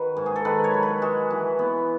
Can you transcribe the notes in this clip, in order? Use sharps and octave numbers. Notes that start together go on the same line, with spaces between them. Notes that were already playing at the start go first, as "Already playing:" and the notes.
Already playing: D#3 F#4 B4
G#2
G#4
A4
D#3 B4
C#5
F#3
B4
G#3 F#4
E3
B3